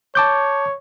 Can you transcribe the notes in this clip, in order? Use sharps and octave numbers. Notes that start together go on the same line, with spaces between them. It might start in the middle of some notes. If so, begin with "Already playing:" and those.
C#5 A5 D6 G6